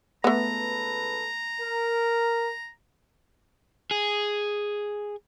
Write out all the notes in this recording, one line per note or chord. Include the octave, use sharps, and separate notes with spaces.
C#2 A3 B3 A4 B4 A#5
A#4
G#4